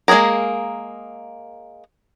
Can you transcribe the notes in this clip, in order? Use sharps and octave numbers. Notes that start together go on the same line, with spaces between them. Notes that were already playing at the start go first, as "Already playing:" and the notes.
G#3 A#3 C#4 G#4 A#4